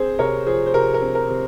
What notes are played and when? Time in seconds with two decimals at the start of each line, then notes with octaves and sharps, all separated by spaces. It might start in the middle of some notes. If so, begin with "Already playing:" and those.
Already playing: C4 G#4 C5
0.19 C3 A#4 C#5
0.46 F3 G#4 C5
0.66 C5
0.74 C3 A#4
0.94 A#4
1.02 C4
1.15 A#4
1.29 C3